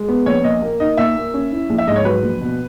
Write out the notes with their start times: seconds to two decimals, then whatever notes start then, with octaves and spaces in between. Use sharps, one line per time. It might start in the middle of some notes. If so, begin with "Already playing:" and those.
Already playing: G#3
0.09 B3
0.26 A#1 C#5
0.44 A#2 D#5
0.62 A#3
0.80 D#4 D#5
0.97 A#2 E5
1.16 A#3
1.34 C#4
1.51 E4
1.70 A#1
1.78 E5
1.87 G#2 D#5
1.96 C#5
2.05 F#3 B4
2.23 A#1
2.41 B2